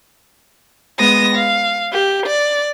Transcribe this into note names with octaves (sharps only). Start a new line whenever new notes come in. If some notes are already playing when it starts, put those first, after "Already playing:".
G#3 B3 D#6 A#6
F5
G4
D5